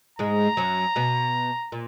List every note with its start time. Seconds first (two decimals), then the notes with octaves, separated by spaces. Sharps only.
0.19 G#2 G#3 A#5
0.57 F#2 F#3
0.96 B2 B3
1.72 A#2